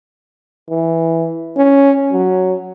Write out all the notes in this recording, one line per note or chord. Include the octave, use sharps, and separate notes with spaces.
E3
C#4
F#3